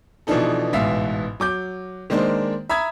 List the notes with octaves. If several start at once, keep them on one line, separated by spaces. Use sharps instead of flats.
B2 E3 F3 D4 D#4 A4
A1 G#2 B2 E5 F5
F#3 D6 G6
D#3 G#3 A#3 D4 C5
E5 A#5 B5 D#6 G#6